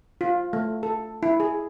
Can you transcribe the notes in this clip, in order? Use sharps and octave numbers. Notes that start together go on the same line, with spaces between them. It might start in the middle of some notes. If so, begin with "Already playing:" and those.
F4
A3
A4
E4
G#4